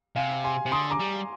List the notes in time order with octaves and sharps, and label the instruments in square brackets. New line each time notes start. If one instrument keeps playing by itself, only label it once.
[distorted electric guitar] C3 [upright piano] F5 G#5
[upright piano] G#5 C6
[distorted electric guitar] C3
[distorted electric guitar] D3 [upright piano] C6 D#6
[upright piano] A#5 D6
[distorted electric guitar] G3